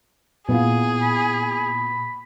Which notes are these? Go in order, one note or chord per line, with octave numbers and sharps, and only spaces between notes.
A#2 B3 E4 F4 G#4
B5